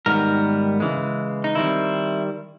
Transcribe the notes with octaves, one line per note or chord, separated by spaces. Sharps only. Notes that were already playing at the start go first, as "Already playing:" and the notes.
G#2 D#3 G3 B3 A#4
C#3 E3 G#3
D#4
D#3 G3 C4 E4